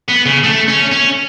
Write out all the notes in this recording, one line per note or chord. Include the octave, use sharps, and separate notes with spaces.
B3
C#3
A3
C#4
C#4